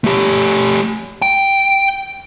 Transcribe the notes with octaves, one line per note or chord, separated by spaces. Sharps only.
A3 G4
G5